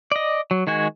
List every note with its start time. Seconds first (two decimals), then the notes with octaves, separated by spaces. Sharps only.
0.12 D5 D#5
0.51 F#3
0.67 D#3 G#3 F#4 G#5